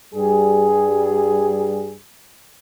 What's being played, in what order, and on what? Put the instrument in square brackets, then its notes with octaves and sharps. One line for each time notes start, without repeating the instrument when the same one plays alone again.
[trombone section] G2 G3 G#4